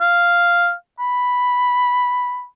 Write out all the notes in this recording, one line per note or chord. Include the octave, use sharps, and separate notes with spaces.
F5
B5